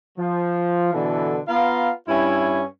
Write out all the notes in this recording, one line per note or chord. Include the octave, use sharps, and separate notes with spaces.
F3
B2 D3 E3 A4
B3 F4 F5 A#5
G2 C#4 E4